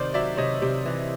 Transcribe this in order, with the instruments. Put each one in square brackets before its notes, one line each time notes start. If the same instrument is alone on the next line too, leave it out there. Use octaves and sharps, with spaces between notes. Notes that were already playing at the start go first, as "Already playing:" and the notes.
Already playing: [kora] C3 D#3 [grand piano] C5 D5
[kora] F#3 [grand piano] D5 E5
[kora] C3 [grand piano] C#5 D#5
[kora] C3
E3